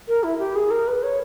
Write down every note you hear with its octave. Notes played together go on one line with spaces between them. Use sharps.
A#4
E4
G4
G#4
A#4
B4
C#5